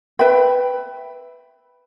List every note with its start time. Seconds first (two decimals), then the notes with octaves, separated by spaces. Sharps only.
0.19 B4 E5 G5 B5